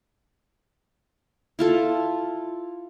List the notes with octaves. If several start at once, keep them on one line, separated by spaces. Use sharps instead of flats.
E4 F4 A4